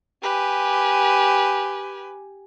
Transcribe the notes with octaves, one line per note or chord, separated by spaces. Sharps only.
G4 B4 G#5